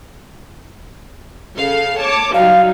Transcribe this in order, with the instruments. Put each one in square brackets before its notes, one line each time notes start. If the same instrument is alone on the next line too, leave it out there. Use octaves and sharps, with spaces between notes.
[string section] C#3 A4 F5
C#5 A5 D6
[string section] F#3 G3 D#4 [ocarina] F5